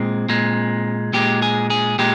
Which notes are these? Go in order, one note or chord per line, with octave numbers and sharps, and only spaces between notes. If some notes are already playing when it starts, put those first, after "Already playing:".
Already playing: A#2 G#3 C4
A#2 G#3
A#2 G#3 G4
G#4
G#4
A#2 G#3 G4